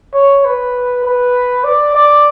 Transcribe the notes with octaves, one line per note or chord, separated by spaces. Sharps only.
C#5
B4
B4
D5
D5